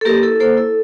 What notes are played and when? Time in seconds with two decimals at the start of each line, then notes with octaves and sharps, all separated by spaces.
0.01 A4
0.05 A#3 G4 A#4
0.23 E4 A4
0.40 A#3 A4 C5
0.57 E4 A4